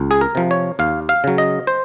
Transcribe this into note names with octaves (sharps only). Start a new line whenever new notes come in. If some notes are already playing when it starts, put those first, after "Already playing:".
Already playing: C#2
G#4
A#4
C3 F3
C#5
D#2 F5
F5
C#3 F#3
D#5
C5